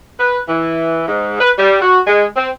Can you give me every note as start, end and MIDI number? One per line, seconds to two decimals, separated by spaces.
0.20 0.38 71
0.48 1.02 52
1.08 1.37 44
1.41 1.52 71
1.58 1.81 55
1.82 1.99 66
2.07 2.25 56
2.36 2.49 60